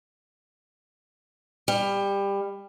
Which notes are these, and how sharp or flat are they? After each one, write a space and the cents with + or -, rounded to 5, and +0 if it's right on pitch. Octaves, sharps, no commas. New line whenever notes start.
G3 +20